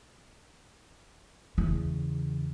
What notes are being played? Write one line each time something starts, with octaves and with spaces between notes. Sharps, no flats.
E2 C#3